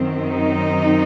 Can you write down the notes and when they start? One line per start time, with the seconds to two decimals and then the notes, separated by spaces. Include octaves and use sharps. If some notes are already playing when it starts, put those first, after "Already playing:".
Already playing: F#2 D#3 F#3 C4
0.21 D#4